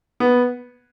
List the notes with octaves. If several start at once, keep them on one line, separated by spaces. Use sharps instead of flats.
B3